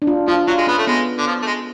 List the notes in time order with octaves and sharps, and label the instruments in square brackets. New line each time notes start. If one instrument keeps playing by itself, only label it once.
[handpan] D4
F4
[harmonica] F3 [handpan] F4
[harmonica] F#3 [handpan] F4
[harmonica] G#3
[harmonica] B3 [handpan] C#4
[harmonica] A3
[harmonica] G#3 [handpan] B3
[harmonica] D3
F3
A3
G#3